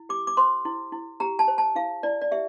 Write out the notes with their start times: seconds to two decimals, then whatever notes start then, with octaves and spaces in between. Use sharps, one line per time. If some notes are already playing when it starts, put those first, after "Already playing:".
Already playing: E4
0.09 G4 D6
0.27 D6
0.37 C5 C6
0.65 E4
0.92 E4
1.20 G4 A#5
1.39 A5
1.48 C5
1.58 A5
1.75 E4 F5
2.03 E4 D5
2.21 D5
2.31 G4 E5